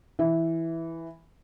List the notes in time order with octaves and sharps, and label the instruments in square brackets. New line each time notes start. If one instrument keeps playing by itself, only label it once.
[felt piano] E3